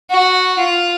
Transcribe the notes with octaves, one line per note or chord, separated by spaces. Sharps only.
F#4
F4